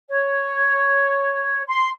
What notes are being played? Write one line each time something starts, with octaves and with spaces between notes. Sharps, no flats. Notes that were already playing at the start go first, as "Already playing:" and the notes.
C#5
C6